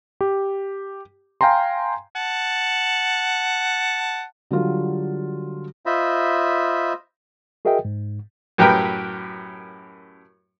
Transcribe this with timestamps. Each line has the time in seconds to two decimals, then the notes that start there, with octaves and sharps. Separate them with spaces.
0.21 G4
1.41 F5 G5 G#5 A#5 C6
2.16 F#5 A5
4.51 D3 F#3 G3 F4
5.86 F4 C5 D#5 E5 B5
7.65 F#4 G#4 A#4 D#5 E5 G5
7.85 G#2
8.58 F#2 A2 G4 A#4 B4 G5